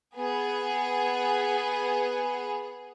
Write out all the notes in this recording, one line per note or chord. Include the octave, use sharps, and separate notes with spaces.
B3 G#4